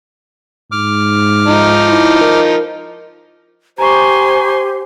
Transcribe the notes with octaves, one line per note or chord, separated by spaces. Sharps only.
G#2 D6 F6
F3 D#4
E4
A#4
G4 C5 G#5 A#5 C6 C#6